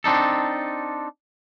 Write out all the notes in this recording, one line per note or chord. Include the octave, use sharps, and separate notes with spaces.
C4 D4 D#4 A4